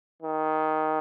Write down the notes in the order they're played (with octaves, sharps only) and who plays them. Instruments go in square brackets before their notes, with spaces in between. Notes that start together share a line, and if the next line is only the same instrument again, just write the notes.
[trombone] D#3